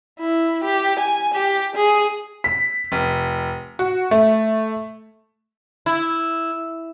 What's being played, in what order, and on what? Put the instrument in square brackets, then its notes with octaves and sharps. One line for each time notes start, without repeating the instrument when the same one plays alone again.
[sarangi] E4
G4
G#5
G4
G#4
[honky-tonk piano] B6
F1
F#4
A3
[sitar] E4